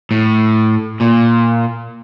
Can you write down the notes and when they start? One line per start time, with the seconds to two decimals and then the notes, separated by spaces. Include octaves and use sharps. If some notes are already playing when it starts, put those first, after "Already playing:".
0.11 A2
1.01 A#2